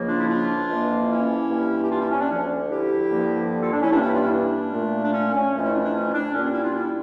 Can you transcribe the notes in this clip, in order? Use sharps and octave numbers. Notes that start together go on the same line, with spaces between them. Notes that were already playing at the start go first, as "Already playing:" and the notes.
Already playing: C#2 C#3 F3 A#3
D4 F4
E4
D4 F4
F2 E3 A#3
C#4 E4
G2 E3 A#3
G4
D4 F4
C#4 E4
C#4
D4
D2 D3 F3 C#4
E4 G4
G2 D3 F3 A#3
F4 A4
D4
C#4 E4
G2 E3 A#3 D4
C#4 E4
D4 F4
C#4 E4
D4
A#2 A3
D4
C#4
C#4
F2 E3 A3
C#4 E4
D4
D4
C#4
E4
D4
A#2 G3 A#3 C#4
D4
C#4 E4
D4 F4
C#4 E4